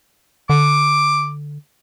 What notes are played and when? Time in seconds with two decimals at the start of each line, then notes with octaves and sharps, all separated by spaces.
0.50 D3 D6